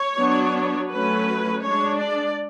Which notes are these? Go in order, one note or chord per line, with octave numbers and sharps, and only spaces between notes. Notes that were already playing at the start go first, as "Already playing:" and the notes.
Already playing: C#5
F#3 B3 D4
F#3 A3 C#4 B4
G#3 D4 C#5
D5